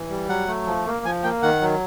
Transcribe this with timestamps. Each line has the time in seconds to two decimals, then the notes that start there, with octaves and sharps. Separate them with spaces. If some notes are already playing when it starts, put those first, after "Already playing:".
Already playing: E3
0.10 G3
0.29 F#3 F#5
0.48 A3
0.67 F3
0.86 A#3
1.05 F3 G#5
1.24 A#3 G5
1.42 D#3 F#5
1.61 F#3